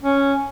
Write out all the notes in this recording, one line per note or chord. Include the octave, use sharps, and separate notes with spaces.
C#4